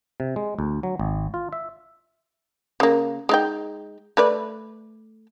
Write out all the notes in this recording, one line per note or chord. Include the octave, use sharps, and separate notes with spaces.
C3
G#3
D2
F#3
G#1
F4
E5
C#3 A#3
G#3 D#4 G5
A3 B4 D5